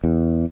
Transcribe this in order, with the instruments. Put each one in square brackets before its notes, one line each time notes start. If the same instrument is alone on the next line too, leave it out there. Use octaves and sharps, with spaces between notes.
[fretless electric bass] E2